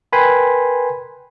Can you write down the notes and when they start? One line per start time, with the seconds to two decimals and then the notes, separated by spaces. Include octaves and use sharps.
0.12 A#4 B4 G5 G#5 B5 C6